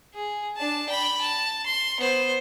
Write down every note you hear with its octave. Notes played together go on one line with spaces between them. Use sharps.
G#4
D4 A5
G5 B5
A5
C6
B3 C5